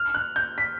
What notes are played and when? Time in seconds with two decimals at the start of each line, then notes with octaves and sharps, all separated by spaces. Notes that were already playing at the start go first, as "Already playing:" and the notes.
Already playing: F6
0.14 F#6
0.36 G6
0.58 B6